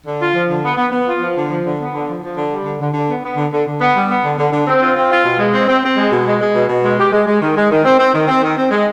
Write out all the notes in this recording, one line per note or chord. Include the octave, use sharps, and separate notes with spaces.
D3
F4
F3
D3
B3
B3
B3
F4
F3
D3
F3
D3
B3
D3
F3
F3
D3
G3
D3
D3
D3
B3
B3
D3
D3
D3
B3
G3
B3
D3
D3
D3
C4
F4
C4
F4
B2
G#3
C4
C4
C4
G#3
B2
G#3
G#3
B2
B2
G#3
G4
G#3
G#3
D#3
G#3
D#3
C4
C4
D#3
C4
D#3
C4
G#3